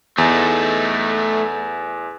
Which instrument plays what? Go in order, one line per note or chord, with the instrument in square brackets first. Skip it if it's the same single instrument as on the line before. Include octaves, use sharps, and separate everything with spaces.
[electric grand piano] E2 [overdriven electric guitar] A3 D#4